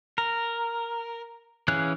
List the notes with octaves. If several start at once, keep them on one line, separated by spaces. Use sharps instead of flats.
A#4
E3 C#4 G#4 F5 F#6